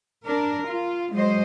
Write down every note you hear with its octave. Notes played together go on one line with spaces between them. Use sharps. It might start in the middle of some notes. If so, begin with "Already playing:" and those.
D4 A#4
F4
F#3 G#3 C5 D#5